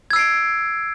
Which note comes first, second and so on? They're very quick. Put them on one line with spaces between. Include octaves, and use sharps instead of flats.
G#6 E6 C7 D7